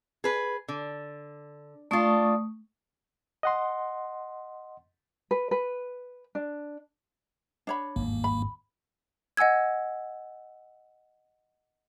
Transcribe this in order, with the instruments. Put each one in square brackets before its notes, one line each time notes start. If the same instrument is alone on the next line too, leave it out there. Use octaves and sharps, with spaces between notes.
[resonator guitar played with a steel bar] G#4 B4
D3
[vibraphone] A3 C#6 D#6 [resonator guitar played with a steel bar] D4 F4
[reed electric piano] D#5 F#5 C6
[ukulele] B4
B4
D4
D4 C#5 B5
[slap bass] G#1 E2 G2 [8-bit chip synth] A#3
[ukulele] B5
[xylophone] D#5 F#5 G#5 E6 G#6